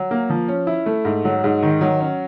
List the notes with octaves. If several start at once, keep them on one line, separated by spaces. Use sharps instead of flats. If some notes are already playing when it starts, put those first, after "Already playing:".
Already playing: F#3
A#3
F3
C#4
E4
A3
G#2
F#3
G#2
D#3
F#3
C#4